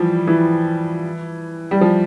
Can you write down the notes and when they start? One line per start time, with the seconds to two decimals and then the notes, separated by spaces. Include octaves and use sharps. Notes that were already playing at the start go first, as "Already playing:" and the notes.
Already playing: E3 F3 G3
0.27 E3
1.71 G3
1.81 F3